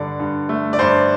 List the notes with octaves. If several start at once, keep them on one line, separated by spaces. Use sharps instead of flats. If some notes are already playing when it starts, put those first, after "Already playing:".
Already playing: G2 D3 D5
G2
A3
D5
G2 C5